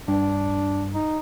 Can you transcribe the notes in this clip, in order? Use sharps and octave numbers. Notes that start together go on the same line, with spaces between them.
G2 D4
D#4